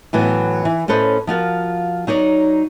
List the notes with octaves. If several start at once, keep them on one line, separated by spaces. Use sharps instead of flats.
A2 E3 F#3 B3
E3
A2 C#4 A4 B4 C5 D#5
F3 F4 F#4 A#4
F#3 D#4 C#5 D5